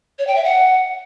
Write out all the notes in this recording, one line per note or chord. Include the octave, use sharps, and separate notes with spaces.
C#5
G5
E5
F#5